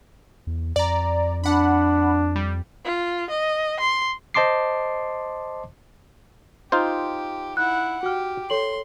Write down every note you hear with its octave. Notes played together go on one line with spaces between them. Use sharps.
E2
F2 D5 A#5
D4 F#5 B5
G3
F4
D#5
C6
C5 D#5 A5 C6 D6 C7
D#4 F4 G4 C5
E4 F#5 F#6
F#4 G4 F6
A4 C#5 C6 F#7